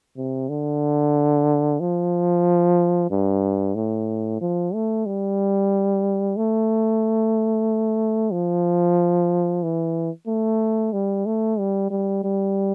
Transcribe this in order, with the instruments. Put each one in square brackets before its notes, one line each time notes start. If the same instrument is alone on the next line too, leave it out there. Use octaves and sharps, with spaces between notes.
[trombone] C3
D3
F3
G2
A2
F3
A3
G3
A3
F3
E3
A3
G3
A3
G3
G3
G3